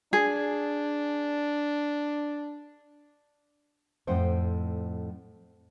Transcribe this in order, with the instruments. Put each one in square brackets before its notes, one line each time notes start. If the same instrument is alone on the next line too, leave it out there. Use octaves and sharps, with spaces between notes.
[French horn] D4 [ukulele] G#4
[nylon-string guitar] F2 A2 C5 F#5 G5